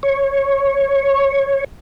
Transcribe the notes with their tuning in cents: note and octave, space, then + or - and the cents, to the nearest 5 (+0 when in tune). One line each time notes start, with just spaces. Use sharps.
C#5 -10